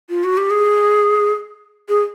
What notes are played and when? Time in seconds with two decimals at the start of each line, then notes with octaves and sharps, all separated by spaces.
0.10 F4
0.24 F#4
0.37 G4
0.51 G#4
1.89 G#4